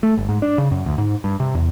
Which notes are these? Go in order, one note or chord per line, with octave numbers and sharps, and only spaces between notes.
A3
G1
G#2
D4
C#3
F#2
D2
G#2
G2
C3
E2